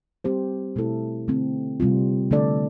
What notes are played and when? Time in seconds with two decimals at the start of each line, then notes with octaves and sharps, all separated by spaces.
0.24 G3 C4 G4 C5
0.76 B2 A3 E4 A4
1.28 D3 A3 C4
1.80 C3 G3 C4 F4
2.31 D3 A3 D4 A4 D5